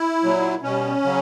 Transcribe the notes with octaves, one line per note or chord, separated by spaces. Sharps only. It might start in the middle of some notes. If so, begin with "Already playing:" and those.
Already playing: E4
A#2 F#3
B2 G3 C#4
C#3 F#3